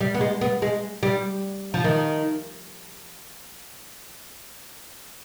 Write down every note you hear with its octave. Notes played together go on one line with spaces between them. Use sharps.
G3
B3
G#3
B3
G#3
G3
F3
D#3